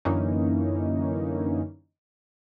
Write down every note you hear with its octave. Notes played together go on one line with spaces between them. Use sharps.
F#2 D3 E3 A#3 C#4 D#4